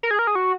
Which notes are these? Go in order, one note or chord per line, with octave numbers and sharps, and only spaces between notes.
A#4
G#4
A#4
G#4
F#4